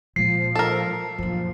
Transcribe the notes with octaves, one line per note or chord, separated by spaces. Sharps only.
A#2 F3 G#3 C7
A4 A#4
A#1 F#2 F3